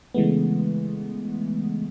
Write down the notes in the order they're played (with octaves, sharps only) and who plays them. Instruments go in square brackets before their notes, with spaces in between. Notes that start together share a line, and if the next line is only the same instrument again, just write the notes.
[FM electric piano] C#3 E3 G#3 A3 B3